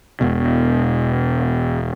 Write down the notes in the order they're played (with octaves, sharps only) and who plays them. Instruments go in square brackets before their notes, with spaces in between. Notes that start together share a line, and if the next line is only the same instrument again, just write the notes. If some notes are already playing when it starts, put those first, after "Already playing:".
[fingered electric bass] E1 B2